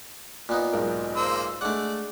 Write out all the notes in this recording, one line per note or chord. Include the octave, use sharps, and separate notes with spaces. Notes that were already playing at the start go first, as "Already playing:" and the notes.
A#2 B3 D#4
B1 G#2 A#4
A#3 C5 E6
G#3 A3 D4 D5 F#5